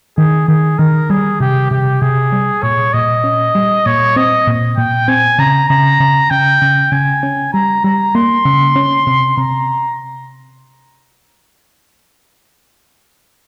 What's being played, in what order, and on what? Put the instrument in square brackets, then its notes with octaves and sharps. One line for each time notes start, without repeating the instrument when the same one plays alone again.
[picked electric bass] D#3 [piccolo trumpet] G#4
[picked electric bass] D#3 [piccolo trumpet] G#4
[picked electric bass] D#3 [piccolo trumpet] A#4
[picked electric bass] G3 [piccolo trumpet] G#4
[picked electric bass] C3 [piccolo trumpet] G4
[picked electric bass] C3 [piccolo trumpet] G4
[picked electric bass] C3 [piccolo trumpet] G#4
[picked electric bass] G3
[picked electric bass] A#2 [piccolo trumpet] C#5
[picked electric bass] A#2 [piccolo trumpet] D#5
[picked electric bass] C#4
G3
[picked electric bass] A#2 [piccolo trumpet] C#5
[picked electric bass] C4 [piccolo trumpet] D#5
[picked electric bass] A#2
[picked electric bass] A#2 [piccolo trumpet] G5
[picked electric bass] C4 [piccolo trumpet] G#5
[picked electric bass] C#3 [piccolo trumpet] A#5
[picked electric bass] C#3 [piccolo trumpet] A#5
[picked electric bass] C#3
[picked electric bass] C#3 [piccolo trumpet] G5
[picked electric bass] C#3
[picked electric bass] C#3 [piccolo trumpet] G#5
[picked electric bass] C#4
[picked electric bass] G3 [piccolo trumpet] A#5
[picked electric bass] G3 [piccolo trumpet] A#5
[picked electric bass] A#3 [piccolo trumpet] C6
[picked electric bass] C#3
C#4
C3
[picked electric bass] C3 [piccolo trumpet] A#5